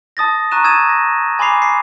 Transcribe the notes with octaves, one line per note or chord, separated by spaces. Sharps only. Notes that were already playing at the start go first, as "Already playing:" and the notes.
A5 D#6 A6 A#6
A#5 C#6 F#6 D#7 E7
D#6 E6 G#6 A6 D#7 E7
A#6
G#5 B5 C6 D6 C7 F7
C7